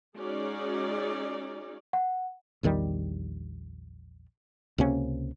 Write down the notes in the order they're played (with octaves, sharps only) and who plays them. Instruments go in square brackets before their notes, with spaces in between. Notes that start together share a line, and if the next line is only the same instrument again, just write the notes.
[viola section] G#3 C#4 D#4 F#4 G#4 D5
[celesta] F#5
[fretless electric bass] A#1 E2 D#3 G3
C#2 C3 A#3 C#4